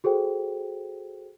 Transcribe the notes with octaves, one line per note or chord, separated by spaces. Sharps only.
F#4 G#4 A4 C5 G5